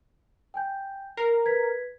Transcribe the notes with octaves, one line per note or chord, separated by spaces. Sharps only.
G5 G#5 G6
A#4 C7
B4 G#6 B6